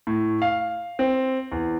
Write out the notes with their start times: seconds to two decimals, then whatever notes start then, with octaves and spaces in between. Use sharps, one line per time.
0.07 A2
0.42 F5
0.99 C4
1.52 E2